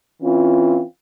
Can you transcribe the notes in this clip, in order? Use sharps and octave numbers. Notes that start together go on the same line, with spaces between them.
E3 C4 C#4 F4